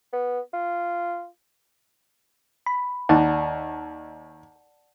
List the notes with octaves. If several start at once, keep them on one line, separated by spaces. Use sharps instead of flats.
B3
F4
B5
D#2 D5 F#5 A5